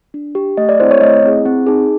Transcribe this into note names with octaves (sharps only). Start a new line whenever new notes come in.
D4
G4
A3 D#5
D5
C4 E4 G#4 C5
C#5
A3 D#5
C4 E4 G#4
C4
D#4 G#4